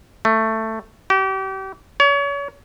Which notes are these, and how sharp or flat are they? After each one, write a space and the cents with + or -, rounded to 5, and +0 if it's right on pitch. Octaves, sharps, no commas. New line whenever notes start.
A3 +10
G4 -35
C#5 +35